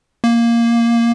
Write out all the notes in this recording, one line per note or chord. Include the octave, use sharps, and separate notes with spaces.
A#3